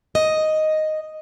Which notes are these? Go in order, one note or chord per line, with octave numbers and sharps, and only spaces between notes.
D#5